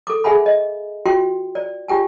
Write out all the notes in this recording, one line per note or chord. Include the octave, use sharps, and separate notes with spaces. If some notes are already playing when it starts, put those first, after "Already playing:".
A4 D6
G#4 E5 F#5 G#5 B5
D#5
F4 F#4 G5 C6
D5
F4 G4 G5 G#5